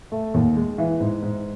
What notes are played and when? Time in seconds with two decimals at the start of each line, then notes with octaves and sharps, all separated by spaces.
0.12 A3
0.34 D#2
0.56 G#3
0.78 E3
1.00 G#2
1.22 G#2